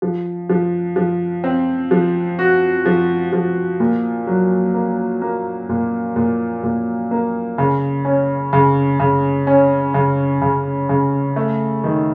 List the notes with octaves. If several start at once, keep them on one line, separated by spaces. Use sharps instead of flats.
F3
F3
F3
C4
F3
F#4
F3
F3
A#2
F#3
A#3
A#3
A#2
A#2
A#2
A#3
C#3
C#4
C#3
C#3
C#4
C#3
C#3
C#3
A3
D#3